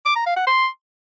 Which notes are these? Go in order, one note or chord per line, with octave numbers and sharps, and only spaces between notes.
D6
A#5
F5
F#5
C6